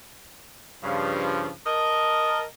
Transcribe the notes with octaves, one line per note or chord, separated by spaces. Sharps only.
G2 C#3 F3
A#4 D#5 A5